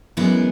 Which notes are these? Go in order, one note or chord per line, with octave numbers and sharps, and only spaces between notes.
F#2 E3 G#3 B3 E4